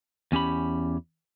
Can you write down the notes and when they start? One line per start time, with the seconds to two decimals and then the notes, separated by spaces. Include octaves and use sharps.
0.32 E2 C#4 G4 B5